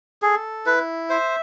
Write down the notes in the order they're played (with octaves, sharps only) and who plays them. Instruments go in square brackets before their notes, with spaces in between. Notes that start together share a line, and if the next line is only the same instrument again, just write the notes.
[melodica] G#4 [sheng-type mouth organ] A4
[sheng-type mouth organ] E4 [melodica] B4
[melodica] C5 [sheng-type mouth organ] E5